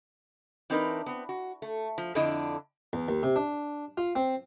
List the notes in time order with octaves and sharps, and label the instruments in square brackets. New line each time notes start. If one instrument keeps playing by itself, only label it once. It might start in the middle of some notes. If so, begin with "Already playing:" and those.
[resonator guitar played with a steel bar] E3 C4 D4 D#4 A#4 B4
B3 C4
F#4
A3
F3
F2 D3 D4 E4 D#5
[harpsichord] E2
D#2
C3
D4
F4
C4